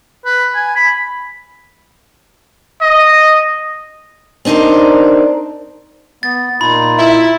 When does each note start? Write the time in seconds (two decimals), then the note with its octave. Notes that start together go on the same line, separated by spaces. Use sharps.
0.25 B4
0.55 G#5
0.76 B5
2.81 D#5
4.45 C4 D4 D#4 A#4 C5
6.23 B3 A6
6.61 A#2 D#4 F4 B5
6.99 E4